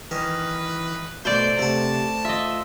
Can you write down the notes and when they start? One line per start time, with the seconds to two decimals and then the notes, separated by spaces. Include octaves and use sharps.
0.11 D#3 E3 C#4 B4
1.25 B2 A3 C5 D5 G6
1.59 C3 A3 F#5 A5
2.25 F4 D#5 E5